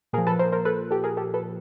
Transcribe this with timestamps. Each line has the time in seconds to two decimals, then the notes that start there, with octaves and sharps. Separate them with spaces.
0.13 A#2 G#4 A#4
0.18 F3
0.27 A4 B4
0.39 A#4 C5
0.52 A#4 C5
0.65 A4 B4
0.91 G4 A4
1.04 G#4 A#4
1.17 G4 A4
1.34 A4 B4